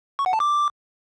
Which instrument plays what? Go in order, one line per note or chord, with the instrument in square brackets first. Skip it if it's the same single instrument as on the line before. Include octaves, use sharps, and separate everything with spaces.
[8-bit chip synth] C#6
F#5
A5
D6